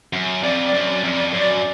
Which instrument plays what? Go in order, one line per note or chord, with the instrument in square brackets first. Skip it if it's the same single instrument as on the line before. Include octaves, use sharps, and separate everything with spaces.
[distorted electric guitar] F#2
[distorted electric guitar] F2 [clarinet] D5
[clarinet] D5
[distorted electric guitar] F#2
[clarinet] D5
[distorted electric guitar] F2
[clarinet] D5
[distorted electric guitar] F#2
[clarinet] D5